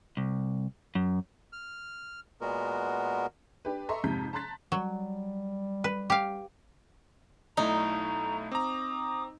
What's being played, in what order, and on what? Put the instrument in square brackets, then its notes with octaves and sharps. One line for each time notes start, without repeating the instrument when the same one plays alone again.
[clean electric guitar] C2
F#2
[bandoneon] F6
A#2 G#3 B3 F#4 A#4
[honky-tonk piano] D4 G4 B4
A4 D#5 E5 A#5 C6 C#6
F2 G#2 C3 A#5 G6 B6
A5 A#5 C6 F#6 A6 B6
[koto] F#3 [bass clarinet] G3
[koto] B4
G4 F5
[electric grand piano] B1 A3 E4 [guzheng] D#4 [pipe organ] A#5
[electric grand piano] C4 A#5 [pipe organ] D6 D#6